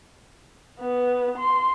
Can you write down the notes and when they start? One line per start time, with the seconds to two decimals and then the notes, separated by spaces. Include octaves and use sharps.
0.81 B3
1.37 C6